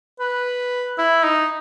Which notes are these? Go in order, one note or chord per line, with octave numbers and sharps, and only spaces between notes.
B4
E4
D#4